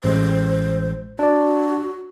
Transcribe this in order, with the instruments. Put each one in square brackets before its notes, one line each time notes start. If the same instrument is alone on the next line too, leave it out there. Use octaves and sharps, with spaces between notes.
[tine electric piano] A1 G#3 [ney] C5
[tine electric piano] D4 D5 [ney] F#4